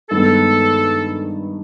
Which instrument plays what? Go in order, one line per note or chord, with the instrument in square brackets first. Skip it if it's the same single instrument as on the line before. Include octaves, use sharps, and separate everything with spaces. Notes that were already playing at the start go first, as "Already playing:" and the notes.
[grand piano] G2 D#3 G#3 B3 [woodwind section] A4